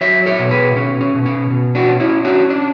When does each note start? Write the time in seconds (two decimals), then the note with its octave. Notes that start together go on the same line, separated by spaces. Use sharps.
0.01 F#3 C#5 E5
0.26 A4 C#5
0.39 B2
0.51 G#4 B4
0.76 B2 C#4
1.01 C#4
1.14 B2
1.26 C#4
1.50 B2
1.75 D4 F#4
1.88 C#4
2.00 C#4 E4
2.25 C#4 D4 F#4
2.50 D4